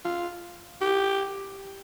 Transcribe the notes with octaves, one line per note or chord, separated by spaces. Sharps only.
F4
G4